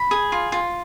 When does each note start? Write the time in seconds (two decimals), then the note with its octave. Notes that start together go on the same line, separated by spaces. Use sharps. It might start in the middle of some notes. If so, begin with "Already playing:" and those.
Already playing: B5
0.11 G#4
0.32 F4
0.52 F4